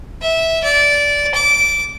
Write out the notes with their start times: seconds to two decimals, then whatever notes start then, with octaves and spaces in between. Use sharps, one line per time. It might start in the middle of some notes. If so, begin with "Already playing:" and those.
0.22 E5
0.63 D5
1.35 D6